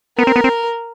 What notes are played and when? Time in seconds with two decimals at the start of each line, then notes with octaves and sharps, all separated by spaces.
0.18 B3 A#4
0.27 C4
0.36 B3
0.44 C4